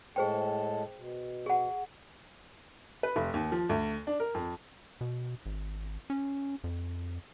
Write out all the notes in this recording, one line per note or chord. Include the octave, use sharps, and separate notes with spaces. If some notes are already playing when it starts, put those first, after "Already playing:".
A2 G#3 G#4 A4 C5 G5
B2
G#4 F#5
B4
F1
D#2
F3
D2
D4
A#4
F2
B2
G#1
C#4
F2